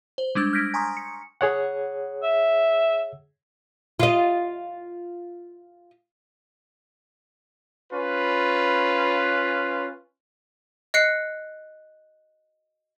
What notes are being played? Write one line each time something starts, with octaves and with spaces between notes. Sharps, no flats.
C5
G3 G#3 D4 E6 G6
F6 G6 G#6 A#6 B6 D7
G#5 A#5 C6 C#6 D#6
C#7
G#4 C#5 F#5
E5
F4 D#5
C#4 F4 B4
D#5 F#6 C7 C#7